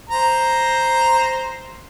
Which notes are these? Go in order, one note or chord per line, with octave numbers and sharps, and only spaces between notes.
C5 A#5